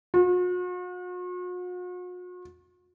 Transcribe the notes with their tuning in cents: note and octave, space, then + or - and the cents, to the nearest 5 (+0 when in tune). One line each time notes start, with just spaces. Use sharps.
F#4 -45